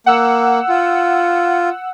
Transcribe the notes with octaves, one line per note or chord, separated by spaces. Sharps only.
A#3 F#5 E6
F4